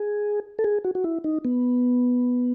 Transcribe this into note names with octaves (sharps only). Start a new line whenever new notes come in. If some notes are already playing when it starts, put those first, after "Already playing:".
Already playing: G#4
A4
G#4
F#4
F#4
E4
D#4
B3